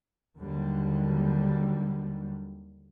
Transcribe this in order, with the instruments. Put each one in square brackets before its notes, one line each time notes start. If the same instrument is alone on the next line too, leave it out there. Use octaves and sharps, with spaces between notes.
[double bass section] D#2 D3 F#3 G3